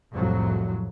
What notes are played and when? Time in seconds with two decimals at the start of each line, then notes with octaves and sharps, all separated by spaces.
0.12 C2 F2 A2 F#3